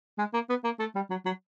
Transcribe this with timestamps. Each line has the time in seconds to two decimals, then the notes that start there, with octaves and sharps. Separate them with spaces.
0.18 G#3
0.34 A#3
0.49 B3
0.64 A#3
0.79 A3
0.95 G3
1.10 F#3
1.25 F#3